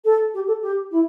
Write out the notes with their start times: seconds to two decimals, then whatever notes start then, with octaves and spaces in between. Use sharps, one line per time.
0.05 A4
0.34 G4
0.48 A4
0.62 G4
0.91 E4